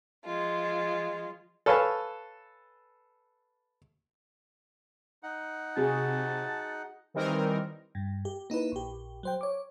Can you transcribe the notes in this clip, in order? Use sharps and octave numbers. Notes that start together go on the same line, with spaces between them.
F3 G#3 F4
A4 B4 C#5 F5 G#5 A5
D#4 F#5
C3 F#4 G#4 A5
D#3 E3 G3 C4 D#4 A#4
G2
G4
A#3 D#4 E4 B4
A#1 G4
F#3 C5 G5
C#5 D6